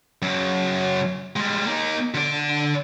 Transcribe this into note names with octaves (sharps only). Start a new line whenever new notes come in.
F#2 C#3
G3 G#3
A#3 D#4
D3 D5